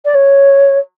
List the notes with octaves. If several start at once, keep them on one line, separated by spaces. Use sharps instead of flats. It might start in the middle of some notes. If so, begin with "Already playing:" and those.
D5
C#5